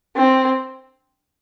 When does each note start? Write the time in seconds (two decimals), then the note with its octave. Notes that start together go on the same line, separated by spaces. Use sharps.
0.16 C4